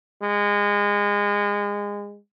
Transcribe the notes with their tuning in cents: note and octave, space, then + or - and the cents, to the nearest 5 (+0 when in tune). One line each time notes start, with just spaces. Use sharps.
G#3 -25